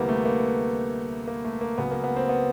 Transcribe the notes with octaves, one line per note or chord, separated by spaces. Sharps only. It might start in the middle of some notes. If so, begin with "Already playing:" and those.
Already playing: D2 C3 E3 G3 A#3 B3
A3
A#3
A#3
A3
A#3
C#2 C#3 F#3 B3
A#3
B3
C4
B3